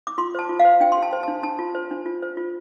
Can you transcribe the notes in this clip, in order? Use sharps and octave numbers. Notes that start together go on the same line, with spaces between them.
D6
F4 C6
C5 A5
F4
F5
C5
D4 G5
C6
G4
A5
C5
D4 A5
D4 A5
F4
C5
D4
F4
C5
F4